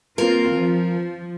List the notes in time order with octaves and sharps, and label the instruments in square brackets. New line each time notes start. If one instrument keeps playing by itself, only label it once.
[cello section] A#3 C4 F4 [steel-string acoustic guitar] A#4
[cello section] F3